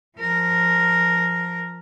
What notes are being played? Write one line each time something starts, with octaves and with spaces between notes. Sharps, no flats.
F3 A#4